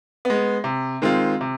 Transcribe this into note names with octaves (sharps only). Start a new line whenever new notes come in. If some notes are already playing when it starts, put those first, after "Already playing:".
G#3 B3
C3
D#3 G#3 C4 F4
C3